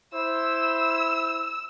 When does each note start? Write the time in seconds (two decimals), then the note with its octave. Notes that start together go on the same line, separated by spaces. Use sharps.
0.14 E4 C5 E6